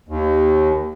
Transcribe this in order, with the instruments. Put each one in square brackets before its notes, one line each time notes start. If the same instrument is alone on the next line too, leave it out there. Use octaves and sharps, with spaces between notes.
[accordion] D#2